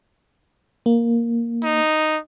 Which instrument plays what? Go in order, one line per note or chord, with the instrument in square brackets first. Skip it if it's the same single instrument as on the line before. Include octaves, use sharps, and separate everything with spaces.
[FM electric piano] A#3
[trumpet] D#4